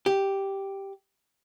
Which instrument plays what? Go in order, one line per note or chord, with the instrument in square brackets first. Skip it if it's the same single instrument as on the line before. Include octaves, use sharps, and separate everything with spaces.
[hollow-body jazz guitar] G4